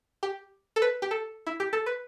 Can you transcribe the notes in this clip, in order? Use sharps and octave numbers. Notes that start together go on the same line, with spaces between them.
G4
A4
B4
G4
A4
E4
G4
A4
B4